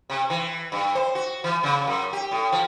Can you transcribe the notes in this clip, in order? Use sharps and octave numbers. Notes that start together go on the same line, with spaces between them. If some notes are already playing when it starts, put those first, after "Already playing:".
C3
E3
G2
C5
F#4
E3
C#3
F#2
G4
A2
F3